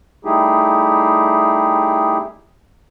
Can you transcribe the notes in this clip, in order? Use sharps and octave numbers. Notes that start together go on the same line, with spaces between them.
G3 A3 D#4 E4 G4 G#4